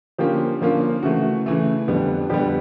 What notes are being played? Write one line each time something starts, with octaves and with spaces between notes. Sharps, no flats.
D3 F3 A#3 C#4 F4 G4
D3 F3 A#3 C#4 F4
C#3 E3 A3 F#4
C#3 E3 A3
F2 D3 G3 B3
F2 D3 G3 B3 G4